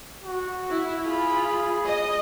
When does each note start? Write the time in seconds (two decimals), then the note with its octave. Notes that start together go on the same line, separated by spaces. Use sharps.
0.24 F#4
0.71 E4
1.06 F4 G#4 B5
1.87 D#5